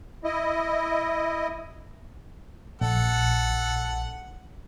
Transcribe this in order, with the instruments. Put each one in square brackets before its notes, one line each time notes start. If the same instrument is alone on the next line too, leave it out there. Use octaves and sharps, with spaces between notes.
[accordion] E4 D#5
[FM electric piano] A#1 [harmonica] A4 F#5